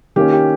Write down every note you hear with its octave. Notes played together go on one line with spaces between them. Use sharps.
D#3 A#3 C#4 G4
G4